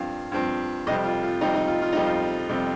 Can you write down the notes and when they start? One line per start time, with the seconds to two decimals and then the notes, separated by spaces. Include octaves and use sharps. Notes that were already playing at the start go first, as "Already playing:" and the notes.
Already playing: G2 F3 C4 F5
0.32 G2 F3 C4
0.87 F2 C3 G3 C4 D#5
1.04 F4
1.23 F4
1.41 F2 C3 G3 C4 D#4
1.54 D#4
1.68 F4
1.82 F4
1.93 F2 C3 G3 C4 D#4
2.05 F4
2.49 F2 C3 G3 C4